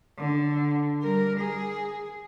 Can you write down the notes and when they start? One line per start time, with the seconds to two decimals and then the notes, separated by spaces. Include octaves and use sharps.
0.18 D3
1.03 G3 A#4
1.40 G#4